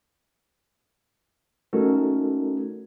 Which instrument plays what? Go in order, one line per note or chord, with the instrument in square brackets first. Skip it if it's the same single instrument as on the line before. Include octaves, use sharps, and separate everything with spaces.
[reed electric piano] A3 C#4 D#4 F#4 A4 A#4